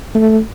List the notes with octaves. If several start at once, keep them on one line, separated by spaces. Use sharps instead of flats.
A3